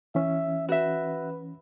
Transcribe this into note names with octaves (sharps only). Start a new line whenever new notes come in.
E3 C#4 E5
F#4 B4 E5